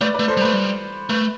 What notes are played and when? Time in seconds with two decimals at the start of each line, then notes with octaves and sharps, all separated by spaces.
0.01 A3 B4 D5
0.14 B4 D5
0.19 A3
0.28 A4 C5
0.37 G3
0.42 A3 B4
0.53 G3
1.09 A3 B4